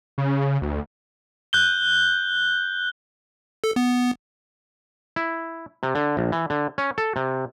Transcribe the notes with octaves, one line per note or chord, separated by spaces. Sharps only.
C#3
D2
F#6 G6 G7
A4
B3
E4
C3
D3
A#1
E3
D3
C#4
A4
C3